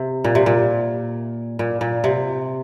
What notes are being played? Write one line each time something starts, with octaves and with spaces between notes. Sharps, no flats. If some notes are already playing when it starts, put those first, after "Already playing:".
Already playing: C3
A#2
C3
A#2
A#2
A#2
C3